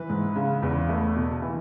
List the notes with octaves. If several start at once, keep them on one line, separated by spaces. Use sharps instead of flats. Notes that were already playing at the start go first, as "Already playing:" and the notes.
Already playing: E3 B4
G#2
C#3
E2
A3
B2
E3